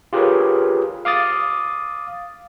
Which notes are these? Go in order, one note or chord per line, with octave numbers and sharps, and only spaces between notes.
F4 G4 G#4 A#4 B4 C#5
F5 D6 D#6 A6